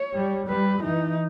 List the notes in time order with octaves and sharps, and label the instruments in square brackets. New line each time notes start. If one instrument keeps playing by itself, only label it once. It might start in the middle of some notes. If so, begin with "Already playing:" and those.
Already playing: [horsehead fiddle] C#5
[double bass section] G3
[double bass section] G3 [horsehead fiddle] B4
[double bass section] E3 [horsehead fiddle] D#4